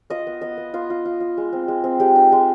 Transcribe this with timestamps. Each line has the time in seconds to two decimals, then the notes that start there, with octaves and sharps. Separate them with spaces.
0.10 F4 D#5
0.27 B3
0.41 B3 D#5
0.57 B3
0.74 B3 F4
0.90 F4
1.05 F4
1.20 F4
1.37 G#3
1.53 C4
1.68 G#3
1.84 C4
2.00 G#3 G4
2.16 D#4
2.32 G#3